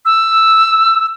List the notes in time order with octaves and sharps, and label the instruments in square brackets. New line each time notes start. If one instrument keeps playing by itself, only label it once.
[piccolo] E6